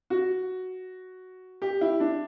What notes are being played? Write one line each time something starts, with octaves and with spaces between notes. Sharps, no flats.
F#4
G4
E4
D4